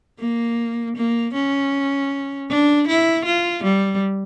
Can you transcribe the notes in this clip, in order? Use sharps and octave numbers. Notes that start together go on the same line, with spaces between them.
A#3
A#3
C#4
D4
E4
F4
G3